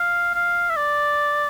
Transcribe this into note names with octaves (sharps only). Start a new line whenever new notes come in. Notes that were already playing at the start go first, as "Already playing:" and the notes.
Already playing: F5
F5
E5
D5